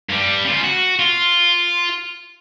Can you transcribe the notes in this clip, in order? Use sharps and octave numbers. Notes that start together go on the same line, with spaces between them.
G2 G3
C#3 F4
F#4
F4